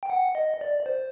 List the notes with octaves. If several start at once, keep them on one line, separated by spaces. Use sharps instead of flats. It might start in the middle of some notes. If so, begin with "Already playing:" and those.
G5
F#5
D#5
D5
C5